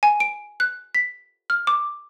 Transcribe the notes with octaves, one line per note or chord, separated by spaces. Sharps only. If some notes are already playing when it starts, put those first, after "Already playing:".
G#5
D7
F#6
B6
F6
D6